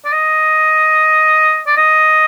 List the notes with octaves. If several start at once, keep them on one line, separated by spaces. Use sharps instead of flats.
D5
D#5
D5
D#5